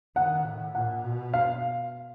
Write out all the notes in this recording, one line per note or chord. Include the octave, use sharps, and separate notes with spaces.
D#3 F#5
A2
A#2 F#5
B2
F5